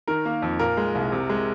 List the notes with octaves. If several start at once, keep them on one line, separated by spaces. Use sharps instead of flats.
D#3 A#4
A#3
F2
A#2 A#4
G#3
C2
C3
G#3